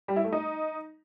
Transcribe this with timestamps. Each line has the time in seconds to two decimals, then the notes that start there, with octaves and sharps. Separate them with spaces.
0.08 G3
0.16 E4
0.24 A3
0.32 D#4